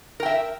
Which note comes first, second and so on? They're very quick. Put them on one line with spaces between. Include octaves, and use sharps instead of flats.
A#4 G5 E5